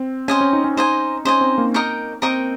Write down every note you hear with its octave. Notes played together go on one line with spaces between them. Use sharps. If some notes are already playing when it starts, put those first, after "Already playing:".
Already playing: C4
C#4 C5 D#5 G#5
C#4
D#4
C#4
D#4 C5 D#5 G#5
C#4 C5 D#5 G#5
C4
A#3
A#4 D#5 G5 C#6
C4 A#4 D#5 G5 C#6